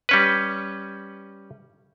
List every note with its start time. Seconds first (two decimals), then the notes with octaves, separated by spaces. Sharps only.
0.09 G3 C#4 B4